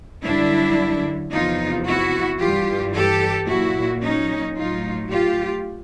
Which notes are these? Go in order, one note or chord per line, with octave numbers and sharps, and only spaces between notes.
F#2 D3 G3 D4 E4
E2 C3 F3 D#4 F4
E4 F#4
G2 E3 G3 F4 G4
G4 A4
A#2 F#3 E4 F#4
C#4 D#4
A2 F#3 D#4 F4
F4 G4